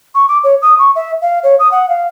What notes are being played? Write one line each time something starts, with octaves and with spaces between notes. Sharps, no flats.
C#6
D6
C#5
D#6
C#6
E5
F5
C#5
D#6
F#5
F5